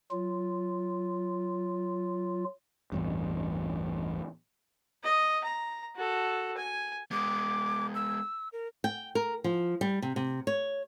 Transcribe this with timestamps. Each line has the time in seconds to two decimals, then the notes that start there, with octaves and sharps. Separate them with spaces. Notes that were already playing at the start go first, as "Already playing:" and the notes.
0.11 F#3 F4
2.92 A1 E2 G2
5.04 D#5
5.44 A#5
5.96 F#4 A4
6.57 G#5
7.11 G#3 B3 D6
7.95 E6
8.53 A#4
8.84 G5
9.15 A#4
9.44 F3
9.81 G3
10.02 C3
10.16 C3
10.47 C#5